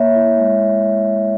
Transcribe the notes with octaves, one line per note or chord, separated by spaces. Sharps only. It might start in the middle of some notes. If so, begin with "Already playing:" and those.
Already playing: A#3 C#5 E5
E4
G#3